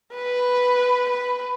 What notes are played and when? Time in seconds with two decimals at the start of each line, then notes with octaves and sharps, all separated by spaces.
0.14 B4
1.10 B4